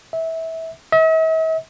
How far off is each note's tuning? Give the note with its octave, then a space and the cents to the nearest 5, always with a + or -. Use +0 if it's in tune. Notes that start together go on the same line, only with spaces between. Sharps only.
E5 -20
E5 -45